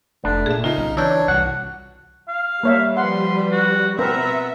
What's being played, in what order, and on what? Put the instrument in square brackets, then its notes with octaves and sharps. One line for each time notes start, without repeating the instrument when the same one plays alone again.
[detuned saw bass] F1 [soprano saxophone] A3 [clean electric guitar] D4
[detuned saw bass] A#2 [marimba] G#4 E5
[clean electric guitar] C#3 [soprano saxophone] D#4 [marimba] F4
[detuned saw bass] B1
[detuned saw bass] E3 [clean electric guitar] D4 [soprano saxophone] C#5 [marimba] E6 G6
[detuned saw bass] C2 [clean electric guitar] G2 F#4 F#5
[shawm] F5
[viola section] G3 [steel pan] A#3 C#5 E5
[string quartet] F3 B4 [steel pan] F#5 [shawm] C6
[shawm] F#4
[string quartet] B2 F4 F#5 [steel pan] C4 A#4 B4 [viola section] E5 [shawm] A#5